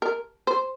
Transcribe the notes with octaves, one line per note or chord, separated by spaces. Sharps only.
A#4
C5